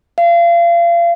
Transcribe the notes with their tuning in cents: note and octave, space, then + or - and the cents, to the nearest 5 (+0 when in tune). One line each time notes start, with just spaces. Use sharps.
F5 -35